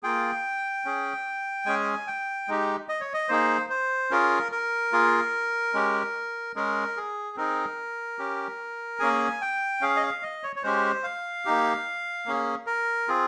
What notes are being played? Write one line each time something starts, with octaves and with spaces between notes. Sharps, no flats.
A#3 F4 G#4 G5
C#4 G#4
G#3 C#4 G#4 G#5
G5
G#3 D#4 G4
D#5
C#5
D#5
A#3 D#4 G#4 C5
C5
C#4 F4 G#4 A#4
A#4
A#3 F4 G#4
G#3 C#4 G4
G#3 C#4 G#4 A#4
G#4
C4 D#4 G#4 A#4
C#4 G4
A#3 C#4 G#4 G#5
G5
C#4 G#4 F5
D#5
F5
D#5
C#5
C#5
G#3 C#4 G4 C5
F5
A#3 D#4 G4
A#3 C#4 G#4
A#4
C4 F4 G#4